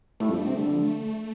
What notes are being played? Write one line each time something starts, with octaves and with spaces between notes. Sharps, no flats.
A2 A3
F2 G3
G2 A3
C3 C4
D3 A3
G3
F3
A3